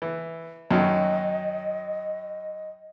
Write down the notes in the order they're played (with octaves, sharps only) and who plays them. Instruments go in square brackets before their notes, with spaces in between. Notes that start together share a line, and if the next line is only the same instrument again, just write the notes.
[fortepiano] E3
[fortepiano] F#2 D#3 F#3 [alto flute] D#5